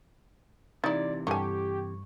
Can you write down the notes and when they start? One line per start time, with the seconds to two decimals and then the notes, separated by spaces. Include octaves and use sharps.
0.84 C3 E3 D#4 E4 D5 A6
1.27 G2 D3 G4 G#5 C#6